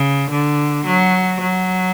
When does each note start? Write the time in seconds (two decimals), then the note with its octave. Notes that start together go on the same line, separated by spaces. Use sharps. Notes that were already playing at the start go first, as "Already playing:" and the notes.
Already playing: C#3
0.30 D3
0.86 F#3
1.40 F#3